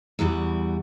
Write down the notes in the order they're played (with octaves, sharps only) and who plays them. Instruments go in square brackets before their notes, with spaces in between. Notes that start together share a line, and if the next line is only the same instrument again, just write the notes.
[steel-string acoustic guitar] E2 E3 G3 F#4